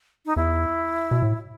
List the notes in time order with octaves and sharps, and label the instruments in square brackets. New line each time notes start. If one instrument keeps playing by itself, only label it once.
[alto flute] D#4
[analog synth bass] E2 [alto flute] E4
[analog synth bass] B2
A2